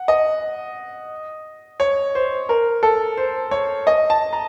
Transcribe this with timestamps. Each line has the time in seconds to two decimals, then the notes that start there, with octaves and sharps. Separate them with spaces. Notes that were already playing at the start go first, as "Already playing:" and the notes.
Already playing: F#5
0.08 D#5
1.80 C#5
2.15 C5
2.49 A#4
2.83 A4
3.17 C5
3.51 C#5
3.87 D#5
4.10 A5
4.33 A#5